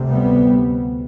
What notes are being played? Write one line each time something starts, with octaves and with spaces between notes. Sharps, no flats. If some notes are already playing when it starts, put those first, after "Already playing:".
Already playing: D2 C3
G3 B3